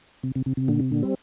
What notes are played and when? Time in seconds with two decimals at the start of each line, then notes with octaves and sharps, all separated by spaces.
0.23 C3
0.35 C3
0.46 C3
0.57 C3
0.68 A#2 D3
0.80 C3
0.91 A#2 D3
1.02 G3 C4